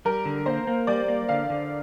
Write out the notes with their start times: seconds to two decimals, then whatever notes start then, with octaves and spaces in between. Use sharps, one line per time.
0.05 G3 A#4
0.25 D3
0.46 A#3 C5
0.67 A#3
0.87 G3 D5
1.08 A#3
1.29 D3 F5
1.50 D3